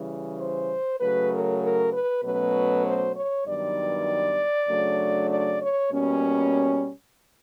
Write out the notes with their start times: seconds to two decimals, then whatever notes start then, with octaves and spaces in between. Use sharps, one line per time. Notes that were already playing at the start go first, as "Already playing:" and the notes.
Already playing: C#3 E3 G3
0.38 C5
1.00 C#3 F#3 A3 B4
1.31 A#4
1.62 A#4
1.92 B4
2.22 B2 F#3 A3 C#4 B4
2.85 C5
3.14 C#5
3.45 G2 D#3 F#3 B3 D5
4.67 C#3 F#3 A3 D4
5.29 D5
5.60 C#5
5.90 B2 G3 A#3 C#4